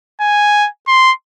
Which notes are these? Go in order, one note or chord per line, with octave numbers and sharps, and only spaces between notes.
G#5
C6